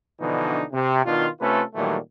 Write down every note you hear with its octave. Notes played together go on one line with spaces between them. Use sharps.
B2 D3 E3 F3 D4 D#4
C3
B2 D#3 D4 F4
C3 A3 C#4 F4 A4 B4
A#2 D#3 E3 F#3 G3 A3